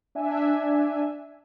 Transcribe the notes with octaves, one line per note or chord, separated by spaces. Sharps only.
D4 E5 G#5